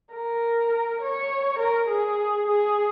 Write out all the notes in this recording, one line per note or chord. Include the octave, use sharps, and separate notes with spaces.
A#4
C#5
A#4
G#4
G#4